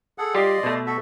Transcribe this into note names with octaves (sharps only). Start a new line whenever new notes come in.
G#4 A4 F#5
G3 F4 G4 D5 D#5 C6
B2 A3
F#4 A4 E5